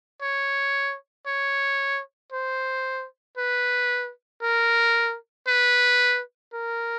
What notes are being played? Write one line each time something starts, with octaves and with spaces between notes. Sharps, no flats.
C#5
C#5
C5
B4
A#4
B4
A#4